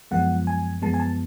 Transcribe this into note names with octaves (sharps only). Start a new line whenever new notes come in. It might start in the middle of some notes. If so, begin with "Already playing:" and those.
F#2 F3 G#3 B3 F#5
G#5
F#2 F3 G#3 B3 A5
G#5
A5